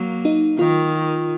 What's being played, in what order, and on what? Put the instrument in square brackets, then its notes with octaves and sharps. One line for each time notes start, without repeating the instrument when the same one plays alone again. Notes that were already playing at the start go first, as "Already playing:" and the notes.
Already playing: [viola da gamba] F#3 A#3
[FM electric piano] D#4
[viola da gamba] D#3 [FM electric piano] F4